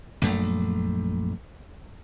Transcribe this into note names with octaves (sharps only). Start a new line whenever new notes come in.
A#1 F#2 A3